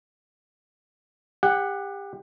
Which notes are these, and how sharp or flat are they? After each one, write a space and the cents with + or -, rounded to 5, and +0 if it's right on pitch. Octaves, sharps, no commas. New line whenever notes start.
G4 +25 F#5 +0